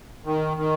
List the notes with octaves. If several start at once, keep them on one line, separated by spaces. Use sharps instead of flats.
D#3
D#3